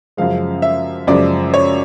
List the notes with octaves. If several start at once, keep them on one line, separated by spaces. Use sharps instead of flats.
F#2 C#3 F3 G#3 F5
E5
F#2 C#3 F3 G#3 D5
C#5